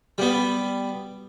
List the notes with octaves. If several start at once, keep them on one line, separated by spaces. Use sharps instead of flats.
G3 B3